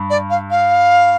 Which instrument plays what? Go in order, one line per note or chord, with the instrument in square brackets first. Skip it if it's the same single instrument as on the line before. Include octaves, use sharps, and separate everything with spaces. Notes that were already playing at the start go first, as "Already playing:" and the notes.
Already playing: [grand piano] G2
[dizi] D5
F5
F5